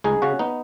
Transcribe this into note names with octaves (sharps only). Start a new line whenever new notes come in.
C#2 D#4 G#4
C#3 C#4 F#4
B3 D#4